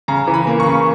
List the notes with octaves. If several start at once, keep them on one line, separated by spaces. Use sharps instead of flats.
C#3 A#5
E3
B5
A#3
C#6
C#3